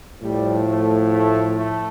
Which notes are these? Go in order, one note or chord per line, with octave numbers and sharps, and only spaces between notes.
A2 F3 G3
A3
A3
A3